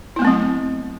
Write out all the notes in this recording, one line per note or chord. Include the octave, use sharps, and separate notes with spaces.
F#3 A3 B3 C4 E4